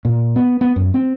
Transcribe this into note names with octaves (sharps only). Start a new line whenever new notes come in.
A#2
B3
B3
F#2
C4